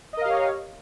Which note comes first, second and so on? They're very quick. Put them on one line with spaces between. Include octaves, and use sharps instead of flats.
D#5 A#4 F5 G4 C#5